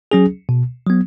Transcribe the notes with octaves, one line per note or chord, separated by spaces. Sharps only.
F#3 C#4 G#4
B2
F#3 B3